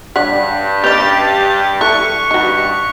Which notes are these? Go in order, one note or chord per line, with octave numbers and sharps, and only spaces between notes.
G2 D4 C#5 F#5 B6
C#4 G4 B4 D#5 A6 F7
E4 A4 C#6 F#6
G2 D#4 F#4